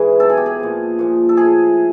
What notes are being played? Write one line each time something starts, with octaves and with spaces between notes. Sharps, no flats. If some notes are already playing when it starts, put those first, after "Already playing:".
Already playing: G#2 E3 G#4
B2 F#3 A4
G#4
G4
G#4
A#2 F3
A#2 F3
A4
A2 F3 G#4